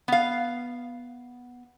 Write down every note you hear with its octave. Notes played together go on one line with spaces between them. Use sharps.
B3 F5